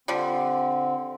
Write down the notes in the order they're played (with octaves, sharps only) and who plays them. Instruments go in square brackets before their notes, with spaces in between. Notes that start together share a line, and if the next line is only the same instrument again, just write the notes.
[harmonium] D3 C4 [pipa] F3 G3